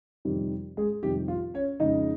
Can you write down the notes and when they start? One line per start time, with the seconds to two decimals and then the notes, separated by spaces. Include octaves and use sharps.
0.25 F2 C3 D#3 G3
0.77 G#3 G#4
1.03 F2 C3 D#3 G3 G4
1.28 F4
1.54 C#4 C#5
1.80 F2 C#3 G#3 D#4 D#5